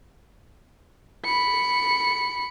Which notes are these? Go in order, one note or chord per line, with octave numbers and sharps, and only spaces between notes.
B5 C#7